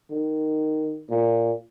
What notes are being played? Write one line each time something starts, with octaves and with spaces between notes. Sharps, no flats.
D#3
A#2